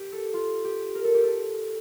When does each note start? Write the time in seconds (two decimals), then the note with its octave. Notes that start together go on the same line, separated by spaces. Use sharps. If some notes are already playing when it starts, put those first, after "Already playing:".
Already playing: G4
0.12 A4
0.34 F4
0.65 G4
0.95 A#4
1.04 A4
1.14 G4
1.24 A4